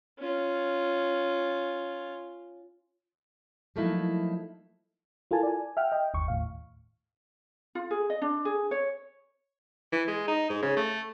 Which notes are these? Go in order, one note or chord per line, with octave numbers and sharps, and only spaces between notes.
C#4 F4
F3 F#3 A3 A#3 D#4 E4
E4 F4 A4 A#4 G#5 A5
D5 G#5
E5 F#5 G5 F6
D#5 G5
G1 D#2 C#6
D#2 A2 F5
F4
G#4
D#5
D4
G#4
C#5
E3
G#3
D#4
G#2
C#3
A3